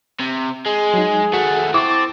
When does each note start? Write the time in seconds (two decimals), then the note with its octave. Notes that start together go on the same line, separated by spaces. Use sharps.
0.20 C3
0.66 G#3 G#4
0.94 F#3 D#4
1.34 D#2 A3 F#4 F#5
1.74 C4 E4 A4 C#6 D6 A6